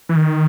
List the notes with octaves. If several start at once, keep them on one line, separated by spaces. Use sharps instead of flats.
E3
D#3